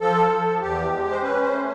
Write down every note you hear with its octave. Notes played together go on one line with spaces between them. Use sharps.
F3 A4
F3
E2 G4
G#3
C5
C#4 B4
C5
A3